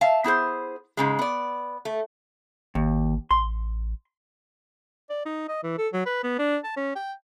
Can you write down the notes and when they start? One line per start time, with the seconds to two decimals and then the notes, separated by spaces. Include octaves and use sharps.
0.01 E5 F5 A5
0.24 B3 E4 G#4 C5
0.97 G#2 C#3 G#3
1.19 B3 D5
1.85 A3
2.75 G#1 D#2
3.31 A1 C6
5.10 D5
5.26 D#4
5.49 D#5
5.63 E3
5.78 A4
5.93 F#3
6.06 B4
6.23 B3
6.39 D4
6.64 A5
6.76 C#4
6.95 G5